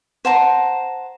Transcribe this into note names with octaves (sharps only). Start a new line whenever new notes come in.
C5 F#5 A5 A#5